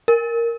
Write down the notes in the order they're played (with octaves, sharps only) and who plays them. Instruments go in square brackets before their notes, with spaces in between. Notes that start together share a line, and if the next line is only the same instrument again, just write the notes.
[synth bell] A#4